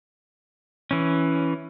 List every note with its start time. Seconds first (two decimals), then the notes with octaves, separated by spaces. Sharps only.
0.91 E3 C#4